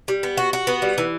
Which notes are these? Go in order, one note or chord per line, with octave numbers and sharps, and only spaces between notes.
G3
B3
F#4
F#4
B3
G3
E3